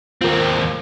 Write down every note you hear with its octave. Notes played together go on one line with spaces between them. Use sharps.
D#2 C4 F4 A#4